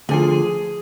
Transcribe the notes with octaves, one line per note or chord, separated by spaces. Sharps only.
D2 D3 F3 G#4